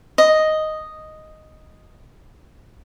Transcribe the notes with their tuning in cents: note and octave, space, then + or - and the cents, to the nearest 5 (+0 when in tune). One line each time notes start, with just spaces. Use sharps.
D#5 +0